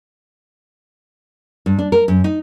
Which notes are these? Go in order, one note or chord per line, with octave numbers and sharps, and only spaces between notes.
G2
D4
A#4
F#2
D#4